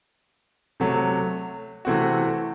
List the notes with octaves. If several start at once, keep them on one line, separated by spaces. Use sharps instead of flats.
C3 F#3 A3
C3 E3 A3 C4 F#4